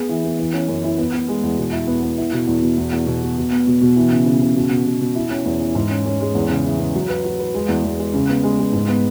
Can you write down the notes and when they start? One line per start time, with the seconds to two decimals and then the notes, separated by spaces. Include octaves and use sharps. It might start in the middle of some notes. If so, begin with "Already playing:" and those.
Already playing: B3 G#4
0.09 E3
0.24 B3
0.39 E3
0.53 C#4
0.68 F#2
0.83 E4
0.98 B3
1.14 B3
1.28 G#3
1.43 E2
1.57 B2
1.72 E4
1.87 B3
2.03 B3
2.18 E4
2.33 B2
2.47 E2
2.62 B2
2.78 E2
2.92 E2
3.07 B2
3.22 B2
3.37 B2
3.52 B3
3.67 B2
3.81 B2
3.96 E3
4.11 C#3
4.26 C#3
4.42 C#3
4.56 B2
4.71 B2
4.86 B2
5.01 B2
5.15 E4
5.31 C#4
5.46 E2
5.60 E3
5.75 G#2
5.90 C#4
6.06 C#4
6.21 G#3
6.35 E2
6.50 C#3
6.65 E3
6.80 C#3
6.95 F#3
7.09 B4
7.24 F#4
7.39 B4
7.54 G#3
7.68 E2
7.84 E2
7.99 G#3
8.14 C#3
8.29 B3
8.43 G#3
8.59 G#3
8.73 G#2
8.88 B3